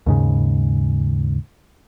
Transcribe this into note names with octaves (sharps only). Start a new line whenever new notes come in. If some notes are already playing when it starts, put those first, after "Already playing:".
D#2 G#2 C#3